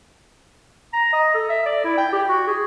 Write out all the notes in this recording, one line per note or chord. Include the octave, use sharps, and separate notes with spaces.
A#5
D#5
A4
E5
D5
E4
G5
G4
F#4
G#4